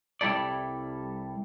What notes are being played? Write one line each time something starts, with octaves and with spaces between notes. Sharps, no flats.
C2 G3 E4 A4 D5